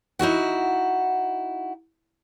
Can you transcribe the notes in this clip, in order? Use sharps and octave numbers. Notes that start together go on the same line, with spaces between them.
D#4 E4 F#4 F#5